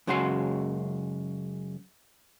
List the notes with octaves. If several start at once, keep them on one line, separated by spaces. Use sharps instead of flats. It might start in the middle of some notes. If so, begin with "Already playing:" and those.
F#2 C#3 G#3 F#4 G#4 C6